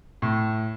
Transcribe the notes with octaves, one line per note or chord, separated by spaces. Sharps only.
A2